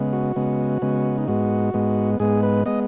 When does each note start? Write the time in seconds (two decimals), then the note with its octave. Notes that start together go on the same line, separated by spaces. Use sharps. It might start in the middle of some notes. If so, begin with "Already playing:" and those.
Already playing: C#3 G#3 B3
0.13 F#4
0.36 C#3 G#3 B3
0.82 C#3 G#3 B3
1.18 D#4
1.28 G#2 G#3 B3 F#4
1.74 G#2 G#3 B3
2.19 G#2 G#3 B3 G#4
2.43 B4
2.65 G#3 B3 D#5